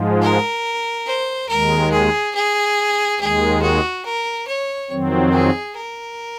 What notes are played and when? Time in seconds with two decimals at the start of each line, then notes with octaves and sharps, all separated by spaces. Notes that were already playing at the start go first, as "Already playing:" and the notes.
Already playing: G#2 F3 G#3
0.22 A#4
1.06 C5
1.49 D#2 D#3 G#3 A#4
1.92 G#4
2.35 G#4
3.20 D#2 D#3 G#3 G#4
3.62 F#4
4.06 A#4
4.47 C#5
4.91 F2 D#3 F#3 C4
5.33 G#4
5.76 A#4